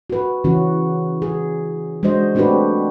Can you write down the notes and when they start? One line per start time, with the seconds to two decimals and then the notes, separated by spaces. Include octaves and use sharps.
0.10 F#4 B4
0.44 C#3 E3 C#4 F#4
1.22 G#4
2.03 G#3 D4 F#4 C5 D#5
2.35 A3 C4 D4 F#4 G4 B4